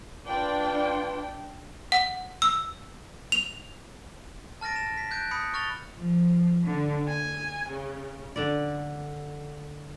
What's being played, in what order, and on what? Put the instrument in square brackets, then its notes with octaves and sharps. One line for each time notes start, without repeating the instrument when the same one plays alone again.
[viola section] D4 G5 [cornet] F4 [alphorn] B4
[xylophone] F#5
E6
F7
[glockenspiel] A5 F6 A6 A#6 D7
E7
B6
F#6 G6 D7
B5 D#6 C#7
C#6 F6 A6 F7 G7
[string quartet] F3
D3
G#5
C#3
[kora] D3 D5